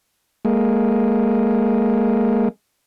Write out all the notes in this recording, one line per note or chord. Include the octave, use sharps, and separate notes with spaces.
G#3 A#3